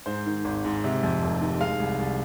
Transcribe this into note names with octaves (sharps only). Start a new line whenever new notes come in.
G#2 C5
D#3
G#1
G#2
C3
F2
F1
D#3
G#3 F5
C2
C2